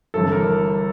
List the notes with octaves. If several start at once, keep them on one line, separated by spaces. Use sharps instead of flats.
G1 G2 E3 A4
A#4